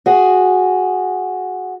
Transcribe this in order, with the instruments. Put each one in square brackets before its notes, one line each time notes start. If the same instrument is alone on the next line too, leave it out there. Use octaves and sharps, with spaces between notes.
[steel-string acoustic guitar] F#4 G#4